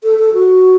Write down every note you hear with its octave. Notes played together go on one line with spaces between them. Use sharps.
A4
A4
F#4